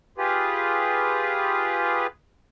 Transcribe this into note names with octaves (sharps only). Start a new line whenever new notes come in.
F4 G4 G#4 B4